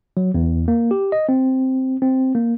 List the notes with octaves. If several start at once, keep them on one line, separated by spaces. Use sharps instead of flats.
F#3
E2
A#3
G4
D#5
C4
C4
A#3